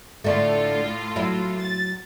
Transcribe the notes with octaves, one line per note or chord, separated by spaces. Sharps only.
A2 D3 A3 F4 A4
F#3 E4
A6